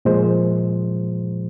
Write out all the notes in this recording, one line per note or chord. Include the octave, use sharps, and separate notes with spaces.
A#2 F3 G#3 C5